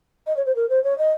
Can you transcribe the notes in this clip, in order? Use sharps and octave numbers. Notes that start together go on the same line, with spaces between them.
D#5
C#5
C5
A#4
C5
C#5
D#5